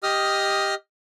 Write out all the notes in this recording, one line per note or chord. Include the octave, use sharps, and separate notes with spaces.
G4 D#5 D#6 F6